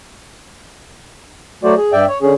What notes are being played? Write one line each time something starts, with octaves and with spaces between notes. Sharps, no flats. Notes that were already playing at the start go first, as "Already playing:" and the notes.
F#3 A3 F#4 C5 D5
G#4
G2 D5 E5 G5
C#5
D3 C#4 G#4